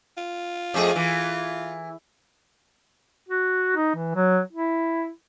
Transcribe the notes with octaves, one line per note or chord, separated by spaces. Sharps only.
F4
F2 A3 G#4
E3
F#4
D#4
E3
F#3
E4